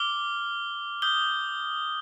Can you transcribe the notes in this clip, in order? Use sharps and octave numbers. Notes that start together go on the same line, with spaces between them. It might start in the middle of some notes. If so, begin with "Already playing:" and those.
Already playing: D6 F6 G7
D#6 G6 G7